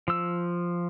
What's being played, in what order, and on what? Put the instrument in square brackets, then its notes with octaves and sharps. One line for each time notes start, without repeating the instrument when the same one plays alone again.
[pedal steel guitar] F3 E6